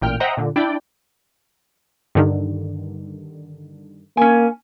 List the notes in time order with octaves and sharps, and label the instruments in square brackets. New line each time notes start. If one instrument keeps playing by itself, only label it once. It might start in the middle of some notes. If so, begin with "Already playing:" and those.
[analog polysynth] A1 A#2 G5 F6
C5 D#5 E5 F#5 G5 A#5
A#2 D3
D4 E4 D5 G5
[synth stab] G2 D3 D#3
[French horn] A#3 [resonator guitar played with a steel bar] C#4 G#5